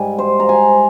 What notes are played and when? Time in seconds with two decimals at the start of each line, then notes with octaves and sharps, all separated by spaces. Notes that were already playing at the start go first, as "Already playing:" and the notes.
Already playing: G#2 G3 G#5
0.19 C5
0.40 A#5
0.49 G#5